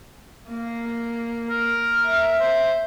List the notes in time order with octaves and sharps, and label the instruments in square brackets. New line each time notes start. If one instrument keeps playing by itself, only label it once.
[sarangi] A#3
[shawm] A#4
[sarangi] E5
[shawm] C5